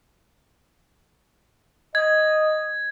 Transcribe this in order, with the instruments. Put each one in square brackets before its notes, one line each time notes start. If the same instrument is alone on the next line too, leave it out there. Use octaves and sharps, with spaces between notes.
[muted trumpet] D#5 [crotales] G#6